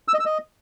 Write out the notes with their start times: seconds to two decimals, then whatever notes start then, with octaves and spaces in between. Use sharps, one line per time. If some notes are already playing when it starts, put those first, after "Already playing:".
0.08 E6
0.14 D#5
0.20 E6
0.25 D#5